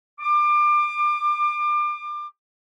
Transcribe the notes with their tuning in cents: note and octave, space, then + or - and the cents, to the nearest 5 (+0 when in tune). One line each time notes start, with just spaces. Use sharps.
D6 +30